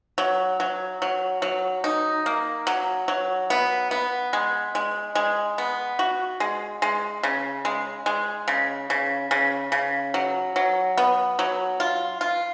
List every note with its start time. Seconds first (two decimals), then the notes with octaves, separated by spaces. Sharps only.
0.18 F#3
0.60 F#3
1.02 F#3
1.42 F#3
1.84 D#4
2.26 A#3
2.67 F#3
3.08 F#3
3.50 B3
3.91 B3
4.33 G#3
4.75 G#3
5.15 G#3
5.58 B3
5.99 F#4
6.40 G#3
6.82 G#3
7.23 C#3
7.65 G#3
8.06 G#3
8.48 C#3
8.90 C#3
9.31 C#3
9.72 C#3
10.14 F#3
10.56 F#3
10.97 B3
11.39 F#3
11.80 F4
12.21 F4